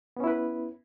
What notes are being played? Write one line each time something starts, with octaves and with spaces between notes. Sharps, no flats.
B3 C#4 E4 B4